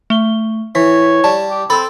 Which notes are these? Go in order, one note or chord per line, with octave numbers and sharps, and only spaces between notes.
A3 G7
E3 C#5 B6
G3 A5
G4
C4 A4 B5